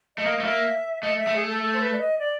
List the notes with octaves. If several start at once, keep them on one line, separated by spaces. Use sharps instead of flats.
A3 D#5
A#3
A3
A#3 E5
A3 D#5
E5
A3
G#4
A4
A4
C5
B4
D5
D#5
D5